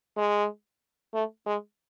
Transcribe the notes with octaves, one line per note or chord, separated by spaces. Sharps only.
G#3
A3
G#3